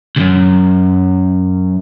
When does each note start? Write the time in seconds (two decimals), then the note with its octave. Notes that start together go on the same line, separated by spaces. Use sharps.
0.16 C#2 F#2